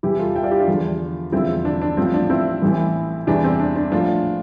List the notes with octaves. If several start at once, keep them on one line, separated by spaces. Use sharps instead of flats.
E2 C3 E3 E4 G4
F4 A4
E5 G5
D5 F5
E4 G4
D4 F4
E2 D3 F3
E1 E2 D3 F3 C4 E4
D4
D4
A1 A2 F3 C4
D4
C4 E4
A1 A2 E3
E2 C3 E3 D4
C4
D4
D4
A#1 A2 F3 D4 F4